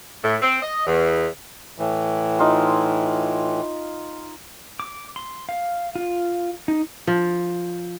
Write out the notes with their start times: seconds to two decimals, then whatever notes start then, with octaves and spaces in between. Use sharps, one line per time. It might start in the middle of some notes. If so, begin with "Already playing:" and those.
0.24 A2
0.42 C4
0.62 D#5
0.86 E2
1.78 A2 E3
2.39 D#4 F4 C5
4.80 D6
5.16 C6
5.49 F5
5.95 F4
6.68 D#4
7.07 F3